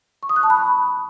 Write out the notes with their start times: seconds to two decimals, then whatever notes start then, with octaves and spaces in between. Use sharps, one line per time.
0.23 C#6
0.29 D#6
0.36 F#6
0.43 A5
0.50 B5